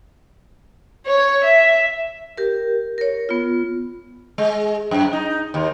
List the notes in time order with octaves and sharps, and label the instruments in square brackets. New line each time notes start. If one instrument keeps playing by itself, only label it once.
[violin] C#5
E5
[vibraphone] G4 A#4
A#4 C#5
B3 F4
[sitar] G#3
F#2
D#4
D#2